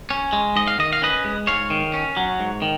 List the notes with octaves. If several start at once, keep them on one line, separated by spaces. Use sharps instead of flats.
C#4
G#3
G#2 D#5
F5
D#3 D#5
F5
C#4 B4 D#5
G#3
G#2 C#5 F5
D#3
C#4
F#3
G#2
D#3